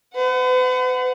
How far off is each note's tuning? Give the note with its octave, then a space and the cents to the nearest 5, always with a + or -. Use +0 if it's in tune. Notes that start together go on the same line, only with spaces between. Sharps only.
B4 +45 F#5 +0